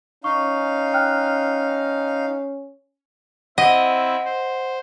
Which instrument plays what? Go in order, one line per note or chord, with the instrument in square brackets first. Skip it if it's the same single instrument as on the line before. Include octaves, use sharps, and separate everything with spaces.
[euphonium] C#4 [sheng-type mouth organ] D#4 F5 [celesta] C#6
[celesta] G5 F6 F#6
[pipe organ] C4 E4 [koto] D#5 [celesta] F#5
[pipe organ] C5